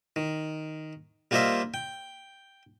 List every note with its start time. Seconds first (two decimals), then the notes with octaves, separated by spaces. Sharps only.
0.16 D#3
1.31 G3 A#3 F4 C5 D#5 E5
1.74 G5